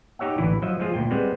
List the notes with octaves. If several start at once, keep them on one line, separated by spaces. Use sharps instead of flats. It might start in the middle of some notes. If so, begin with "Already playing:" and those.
D#4 G4 C#5 E5 F#5
A1 D3 E3 E4 B4
F3 F#3 D#5 E5
F3 G#3 F4 G#4
D2 A#2 G5
G3 G#3 B3 C4